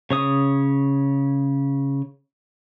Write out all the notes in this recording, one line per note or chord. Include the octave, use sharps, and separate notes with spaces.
C#3 C#5 D#6